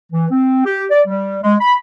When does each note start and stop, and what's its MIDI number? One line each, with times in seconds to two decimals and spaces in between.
0.12 0.26 52
0.31 0.63 60
0.65 0.85 67
0.91 1.01 74
1.06 1.38 55
1.43 1.55 56
1.61 1.76 83